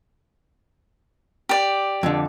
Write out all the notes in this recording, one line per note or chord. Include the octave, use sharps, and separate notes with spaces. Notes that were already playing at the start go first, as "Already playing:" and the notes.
G4 D5
F2 D3